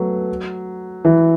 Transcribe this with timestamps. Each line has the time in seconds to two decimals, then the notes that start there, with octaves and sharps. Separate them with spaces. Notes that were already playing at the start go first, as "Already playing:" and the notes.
Already playing: F#3 A3 B3
1.05 E3